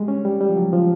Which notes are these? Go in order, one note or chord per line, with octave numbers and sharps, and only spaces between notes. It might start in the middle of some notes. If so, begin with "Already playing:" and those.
Already playing: G3 G#3
C#4
G3
G3
F3
F#3
F3